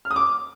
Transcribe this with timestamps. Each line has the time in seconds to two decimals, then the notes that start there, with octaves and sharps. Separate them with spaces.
0.05 F6
0.11 D#6
0.16 D6